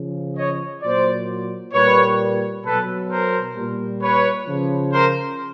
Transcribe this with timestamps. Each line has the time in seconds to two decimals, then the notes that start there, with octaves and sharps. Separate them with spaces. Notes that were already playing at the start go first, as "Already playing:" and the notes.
Already playing: C#3 F3
0.36 C#5 D#5
0.82 A#2 F#3 C5 D5
1.73 A#2 G3 B4 C#5
2.65 B2 F#3 A4 B4
3.09 A#4 C5
3.56 A#2 G3
4.01 B4 C#5
4.46 C#3 F3
4.92 A#4 C5